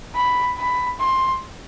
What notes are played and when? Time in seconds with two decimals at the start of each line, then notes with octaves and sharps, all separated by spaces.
0.15 B5
0.58 B5
1.00 C6